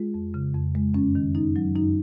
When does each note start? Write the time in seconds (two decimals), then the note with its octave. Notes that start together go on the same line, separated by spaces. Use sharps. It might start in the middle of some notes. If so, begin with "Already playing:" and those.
Already playing: G#3 F4 G#4
0.14 F2
0.34 C#3
0.54 F2
0.75 G#3
0.94 F#2 C#4
1.15 D#3
1.35 F#2 D#4
1.56 F#3
1.76 F#2 D#4